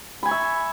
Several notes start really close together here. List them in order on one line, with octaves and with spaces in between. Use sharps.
B5 G#5 C#6 E5